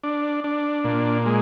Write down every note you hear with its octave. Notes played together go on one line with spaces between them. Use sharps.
D4
D4
A#2
G#3